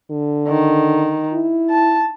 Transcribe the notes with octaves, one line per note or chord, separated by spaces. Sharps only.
D3
D#3
E4
A5